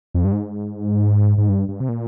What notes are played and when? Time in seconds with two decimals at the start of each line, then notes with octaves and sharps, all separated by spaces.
0.14 F2
0.25 G2
0.33 G#2
1.38 G#2
1.49 G2
1.69 G2
1.80 C3
1.89 A#2